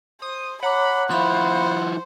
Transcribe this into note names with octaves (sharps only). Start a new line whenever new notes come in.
C5 D#6
C#5 F#5 A#5 B5 D6
F3 E4 C5 F5 B5 C#6